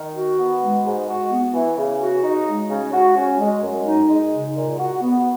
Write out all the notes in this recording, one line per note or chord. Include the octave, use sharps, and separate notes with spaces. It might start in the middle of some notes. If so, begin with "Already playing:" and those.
Already playing: D#3
F#4
B3
G#3
G#2
F#4
B3
E3
C#3
F#4
D#4
G#3
C#3
F#4
C#4
G#3
F#2
D#4
G#3
C#3
A#2
F#4
B3